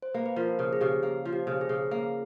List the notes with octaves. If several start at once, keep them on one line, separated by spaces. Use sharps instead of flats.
C5
A#3 B4
B4
F3 A#4
C#3
G#4
C#3 G4
A#3
F3
G4
C#3
G#4
C#3
A#3